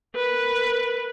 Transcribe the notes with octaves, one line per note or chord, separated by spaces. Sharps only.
A#4 B4